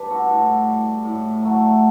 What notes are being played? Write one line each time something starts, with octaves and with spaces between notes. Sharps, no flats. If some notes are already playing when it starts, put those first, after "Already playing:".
Already playing: G3 D4 B4
F#4 A4
A2
G3
A2
F#3 A3